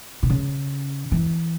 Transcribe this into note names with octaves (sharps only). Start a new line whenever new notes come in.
B2
C#3
E3